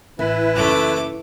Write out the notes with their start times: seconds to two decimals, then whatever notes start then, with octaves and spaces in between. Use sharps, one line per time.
0.19 A1 E3 E4 B4
0.55 F#1 A3 D#4 D6